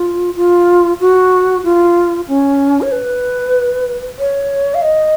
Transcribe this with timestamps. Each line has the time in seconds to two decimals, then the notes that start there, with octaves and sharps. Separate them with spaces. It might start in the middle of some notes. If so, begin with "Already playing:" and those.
Already playing: F4
0.36 F4
1.00 F#4
1.64 F4
2.28 C#4
2.82 C#5
2.92 B4
4.19 C#5
4.75 F5
4.82 D#5